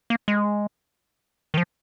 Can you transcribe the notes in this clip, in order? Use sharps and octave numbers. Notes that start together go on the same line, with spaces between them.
A#3
G#3
D#3
F3